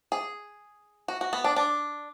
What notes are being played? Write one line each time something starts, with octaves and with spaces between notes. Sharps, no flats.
G#4
F#4
F#4
B3
D4
D4